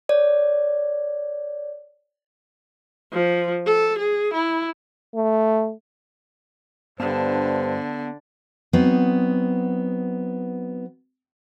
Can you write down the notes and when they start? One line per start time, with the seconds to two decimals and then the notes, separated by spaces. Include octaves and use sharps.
0.09 C#5 D5
3.13 F3
3.66 A4
3.99 G#4
4.34 E4
5.15 A3
7.00 G2 D3 B3 C5 F5 A5
8.73 F#3 B3 C4 D#4